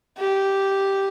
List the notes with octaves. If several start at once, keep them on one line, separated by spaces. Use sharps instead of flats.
G4